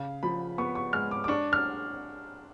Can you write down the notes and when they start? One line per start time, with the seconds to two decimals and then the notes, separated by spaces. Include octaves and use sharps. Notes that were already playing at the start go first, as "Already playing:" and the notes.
Already playing: C#3 F5
0.23 F3 B5
0.58 B3 C#6
0.75 C#6
0.93 G#3 F6
1.11 D6
1.24 D6
1.28 D4 C#6
1.53 F6